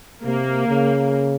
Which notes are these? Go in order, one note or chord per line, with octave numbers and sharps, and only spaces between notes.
C3 A#3
C#3